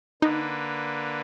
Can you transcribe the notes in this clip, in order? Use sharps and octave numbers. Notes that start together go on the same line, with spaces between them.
D3 A#3 D#4 B4